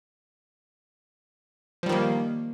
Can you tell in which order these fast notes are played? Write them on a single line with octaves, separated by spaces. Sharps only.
F3 G3 D#3 A#3